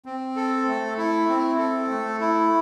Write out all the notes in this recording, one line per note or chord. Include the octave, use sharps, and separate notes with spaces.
C4
A4
A3
E4
C4
A4
A3
E4